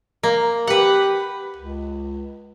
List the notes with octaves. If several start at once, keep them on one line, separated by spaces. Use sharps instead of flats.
A#3
G4 B4 F#5
C#2